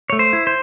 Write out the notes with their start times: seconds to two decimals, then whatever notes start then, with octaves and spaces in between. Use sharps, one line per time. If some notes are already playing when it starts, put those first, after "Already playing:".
0.10 A3 C#5
0.19 C5
0.33 E4
0.47 C5